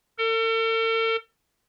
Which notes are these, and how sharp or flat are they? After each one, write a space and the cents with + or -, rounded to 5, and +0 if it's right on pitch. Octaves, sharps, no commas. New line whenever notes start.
A4 +45